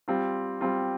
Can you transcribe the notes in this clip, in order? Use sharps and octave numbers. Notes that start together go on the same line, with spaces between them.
G3 C4 F4
G3 C4 F4